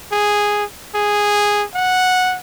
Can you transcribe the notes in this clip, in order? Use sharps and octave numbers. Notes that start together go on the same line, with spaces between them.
G#4
G#4
F#5